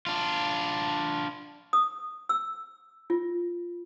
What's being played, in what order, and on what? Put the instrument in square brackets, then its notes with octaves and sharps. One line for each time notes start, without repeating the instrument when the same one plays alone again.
[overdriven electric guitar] D4 F4
[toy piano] D#6
E6
F4